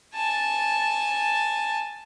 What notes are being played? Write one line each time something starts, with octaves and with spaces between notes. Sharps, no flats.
G#5 A5